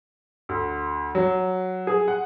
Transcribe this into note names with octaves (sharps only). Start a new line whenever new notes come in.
D2
F#3
G#4
F#5